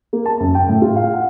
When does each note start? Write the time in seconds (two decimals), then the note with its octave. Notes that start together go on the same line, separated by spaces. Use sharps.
0.13 A#3
0.26 A5
0.40 F#2
0.55 G5
0.68 A2
0.82 F4
0.96 F5
1.14 F#5